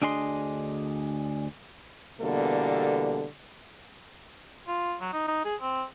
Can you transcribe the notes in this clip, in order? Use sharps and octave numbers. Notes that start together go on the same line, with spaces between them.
D2 D4 G#4 D#5 C6
E2 B2 D3 G3 A#3 A4
F4
F#3
D#4
D#4
G#4
C4